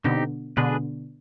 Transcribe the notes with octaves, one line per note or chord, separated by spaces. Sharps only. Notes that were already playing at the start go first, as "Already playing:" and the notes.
B2 D3 C4 D#4 G4
B2 D3 G#3 D4 G#4 B4